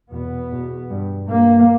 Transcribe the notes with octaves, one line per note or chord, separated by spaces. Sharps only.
E2 B2 B3
E2 B2
G2
G2 A#3